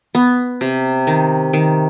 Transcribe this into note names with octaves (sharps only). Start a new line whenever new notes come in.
B3
C3
D#3
D#3